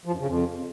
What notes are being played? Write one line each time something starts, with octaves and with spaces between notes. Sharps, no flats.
F3
F#2
C#3
F2